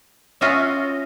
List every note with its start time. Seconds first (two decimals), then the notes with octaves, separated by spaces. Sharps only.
0.41 C#4 F4 F#4 D#5 E5